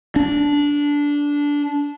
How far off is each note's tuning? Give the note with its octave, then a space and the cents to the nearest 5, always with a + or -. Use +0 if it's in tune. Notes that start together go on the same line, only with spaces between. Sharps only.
D4 -15